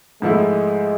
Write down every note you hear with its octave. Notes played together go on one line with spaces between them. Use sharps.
G#2 F3 G#3 A3 E4